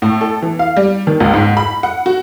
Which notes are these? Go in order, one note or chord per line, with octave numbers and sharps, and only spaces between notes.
A2
A4
E3
F5
G3
D#3
C#2
G#2
B5
F#5
F#4